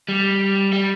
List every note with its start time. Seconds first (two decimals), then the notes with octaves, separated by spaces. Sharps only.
0.08 G3
0.73 G3